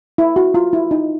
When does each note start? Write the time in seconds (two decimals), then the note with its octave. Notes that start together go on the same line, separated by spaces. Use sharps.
0.18 E4
0.36 F#4
0.54 F4
0.73 E4
0.91 D#4